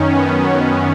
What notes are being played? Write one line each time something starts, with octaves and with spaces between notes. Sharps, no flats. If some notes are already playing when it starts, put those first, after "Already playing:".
Already playing: F#2 D#3 C#4
B3
C#4